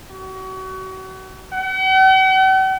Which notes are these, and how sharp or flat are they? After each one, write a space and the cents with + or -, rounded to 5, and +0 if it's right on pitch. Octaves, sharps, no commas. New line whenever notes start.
F#4 +35
F#5 +45